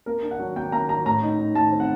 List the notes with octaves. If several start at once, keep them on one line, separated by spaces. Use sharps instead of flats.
A#3 A#4
D4
F#5
F#3
A#3 G5
A#3 A#5
F#3 A#5
A2 A#5
D#4
D#4
A2 A5
C4
F#5